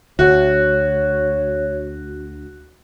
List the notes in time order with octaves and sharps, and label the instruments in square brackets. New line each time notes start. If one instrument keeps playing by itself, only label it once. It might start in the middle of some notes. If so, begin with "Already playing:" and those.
[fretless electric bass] D2 [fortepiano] F#4 [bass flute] C#5